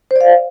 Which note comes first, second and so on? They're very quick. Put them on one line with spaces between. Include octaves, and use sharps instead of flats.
C5 D5 F5